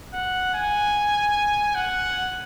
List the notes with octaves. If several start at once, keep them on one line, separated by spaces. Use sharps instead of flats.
F#5
G#5
F#5